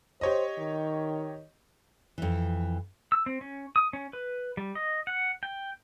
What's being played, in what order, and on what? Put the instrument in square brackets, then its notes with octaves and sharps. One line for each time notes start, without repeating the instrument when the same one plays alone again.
[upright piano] G4 C#5 D#5 [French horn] C5
[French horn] D#3
[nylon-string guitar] F2 E3
[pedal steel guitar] E6
C4
C#4
D#6
C#4
B4
G3
D#5
F#5
G5